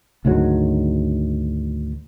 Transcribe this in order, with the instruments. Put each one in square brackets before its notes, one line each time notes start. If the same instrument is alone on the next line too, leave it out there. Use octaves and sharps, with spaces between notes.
[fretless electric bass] D2 G#2 D#3 F#3